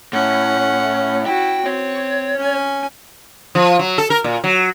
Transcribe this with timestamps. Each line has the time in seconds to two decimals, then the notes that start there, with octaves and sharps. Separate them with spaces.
0.13 A2 C#4 F#5
1.26 E4 F#4 G5
1.66 C4 C#5
2.37 C#4 G#5
3.55 F3
3.79 F#3
3.98 A4
4.10 A#4
4.24 A#2
4.44 F#3